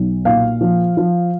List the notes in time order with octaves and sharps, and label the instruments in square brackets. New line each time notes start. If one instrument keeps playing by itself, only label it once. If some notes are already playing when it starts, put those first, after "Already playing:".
Already playing: [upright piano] B1
A#2 F5
F3
F3